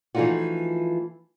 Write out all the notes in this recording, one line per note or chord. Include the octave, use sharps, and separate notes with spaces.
E3 F3 A3 D#4 F4 F#4